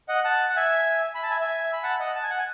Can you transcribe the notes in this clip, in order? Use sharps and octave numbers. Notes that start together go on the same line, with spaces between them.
D#5 F#5
F#5 A5
F#5
E5 G#5
B5
A5
E5 G#5
E5 G#5
B5
F#5 A5
D#5 F#5
A5
G#5
F#5
G#5